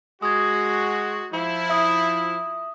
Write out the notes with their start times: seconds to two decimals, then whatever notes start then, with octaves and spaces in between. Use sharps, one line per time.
0.22 G#3 F#4 D#6 G#6
1.33 F3 E4
1.70 E5 D#6